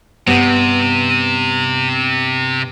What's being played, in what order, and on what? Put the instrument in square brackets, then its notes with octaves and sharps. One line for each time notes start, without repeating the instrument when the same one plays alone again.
[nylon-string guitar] G2 B3 [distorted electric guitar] C3